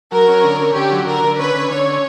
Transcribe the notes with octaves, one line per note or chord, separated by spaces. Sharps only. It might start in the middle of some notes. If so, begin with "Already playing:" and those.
F#3 A#4
C#4
D3
C#4
D3 G4
F#3
D3 A#4
D3
C#4 B4
D3
D3 C#5
C#4